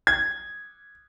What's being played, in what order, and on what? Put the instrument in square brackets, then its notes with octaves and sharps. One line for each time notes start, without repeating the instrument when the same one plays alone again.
[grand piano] G#6